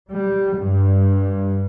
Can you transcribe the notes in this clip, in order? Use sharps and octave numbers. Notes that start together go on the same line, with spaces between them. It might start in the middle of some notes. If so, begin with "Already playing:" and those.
G3
G2